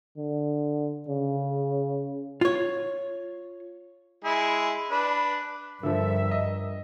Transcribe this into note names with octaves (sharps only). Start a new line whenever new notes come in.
D3
C#3
F4 C#5
G#3 E4 G#4
D4 B4
G2 D3 F3 A#4 E5
D#5